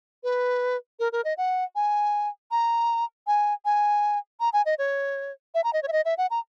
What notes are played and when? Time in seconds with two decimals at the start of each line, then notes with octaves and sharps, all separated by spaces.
0.24 B4
1.00 A#4
1.12 A#4
1.25 D#5
1.38 F#5
1.75 G#5
2.51 A#5
3.27 G#5
3.65 G#5
4.40 A#5
4.53 G#5
4.66 D#5
4.78 C#5
5.55 E5
5.64 A#5
5.73 D#5
5.83 C#5
5.88 E5
5.92 D#5
6.05 E5
6.18 F#5
6.30 A#5